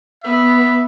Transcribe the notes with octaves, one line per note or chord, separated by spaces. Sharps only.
B3 E5